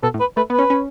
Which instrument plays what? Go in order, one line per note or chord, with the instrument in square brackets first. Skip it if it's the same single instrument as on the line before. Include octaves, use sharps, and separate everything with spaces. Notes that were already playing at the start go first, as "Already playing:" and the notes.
[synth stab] B2 [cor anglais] A4
[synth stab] A2
[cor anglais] B4
[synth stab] A3 [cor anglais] B4
[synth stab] B3 [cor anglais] B4
[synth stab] C#4
C#4